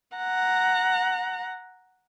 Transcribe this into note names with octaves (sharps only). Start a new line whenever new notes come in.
F#5 A#5